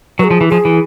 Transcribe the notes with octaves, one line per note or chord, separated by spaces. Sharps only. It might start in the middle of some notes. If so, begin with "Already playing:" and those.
F#3 G#4 B4
F3
E3
F3 G#4
E3